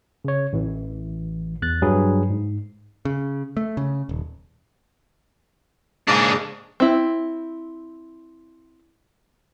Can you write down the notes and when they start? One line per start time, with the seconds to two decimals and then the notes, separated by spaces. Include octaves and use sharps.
0.25 C#3 C#5
0.53 A1 E3
1.62 E2 F#6 A6
1.82 G2 F#3 G#4 B4
2.30 G#2
3.05 C#3
3.57 A3
3.77 C#3
4.09 D#1
6.08 G#2 C#3 A#3 D4 G#4
6.80 C4 E4